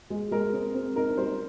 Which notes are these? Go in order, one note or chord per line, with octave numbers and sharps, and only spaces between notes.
G#3
G#3 A#4
C4
C4
D#4 A#4
G3 C5